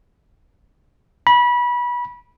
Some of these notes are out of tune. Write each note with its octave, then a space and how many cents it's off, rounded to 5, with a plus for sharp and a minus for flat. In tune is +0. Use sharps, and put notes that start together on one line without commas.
B5 -25